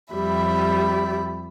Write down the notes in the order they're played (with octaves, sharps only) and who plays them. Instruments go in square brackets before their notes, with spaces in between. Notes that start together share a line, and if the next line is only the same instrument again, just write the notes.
[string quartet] F2 G3 E5 B5